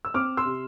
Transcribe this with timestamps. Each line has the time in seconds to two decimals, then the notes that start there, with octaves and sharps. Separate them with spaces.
0.05 E6
0.14 C4 D6 F6
0.37 C6 E6
0.45 C3